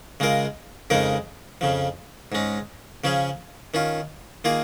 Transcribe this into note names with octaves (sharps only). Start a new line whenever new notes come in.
C#3 G#3 F4 A#4
F2 C#3 G#3 D#4 A#4
F2 C#3 F3
G#2 G#3 C#4
C#3 F3 C#4 G#4
D#3 C#4 F4
D#3 A#3 F4 G#4